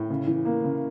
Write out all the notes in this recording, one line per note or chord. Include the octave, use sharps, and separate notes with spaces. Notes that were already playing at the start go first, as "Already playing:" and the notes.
Already playing: A2
C#3
E3
A#3
C#3